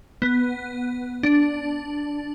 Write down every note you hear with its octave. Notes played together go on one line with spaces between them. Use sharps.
B3
D4